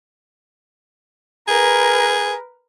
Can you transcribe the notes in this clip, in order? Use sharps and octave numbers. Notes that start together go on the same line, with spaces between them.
G#4 A#4 B4